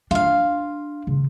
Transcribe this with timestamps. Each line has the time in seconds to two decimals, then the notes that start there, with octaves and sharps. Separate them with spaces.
0.11 D4 F4 F5
1.07 C#3